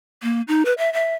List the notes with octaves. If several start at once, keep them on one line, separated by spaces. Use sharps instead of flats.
A#3
D#4
B4
E5
E5